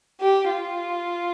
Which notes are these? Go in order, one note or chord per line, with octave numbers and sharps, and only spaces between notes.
G4
F4